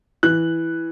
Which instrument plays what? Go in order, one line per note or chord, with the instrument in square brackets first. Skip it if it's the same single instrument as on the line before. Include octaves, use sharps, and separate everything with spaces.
[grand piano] E3 F#6